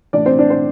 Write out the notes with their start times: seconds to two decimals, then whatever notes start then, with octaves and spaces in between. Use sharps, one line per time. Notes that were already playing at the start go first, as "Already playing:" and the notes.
0.13 A2 E3 D4 D5
0.26 C4 C5
0.38 D4 D5
0.50 C4 C5